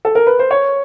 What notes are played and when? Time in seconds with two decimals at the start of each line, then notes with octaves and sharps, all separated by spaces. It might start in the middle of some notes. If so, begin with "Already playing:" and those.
0.05 A4
0.15 A#4
0.27 B4
0.39 C5
0.51 C#5